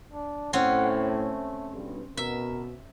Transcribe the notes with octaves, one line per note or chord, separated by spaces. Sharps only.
D4
A2 C4 C#4 F#5
A3
B1 G2
B2 A#4 E5